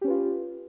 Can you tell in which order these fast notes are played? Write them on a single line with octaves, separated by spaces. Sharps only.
G4 C#4 B4 F4